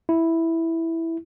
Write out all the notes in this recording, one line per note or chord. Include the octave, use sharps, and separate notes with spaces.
E4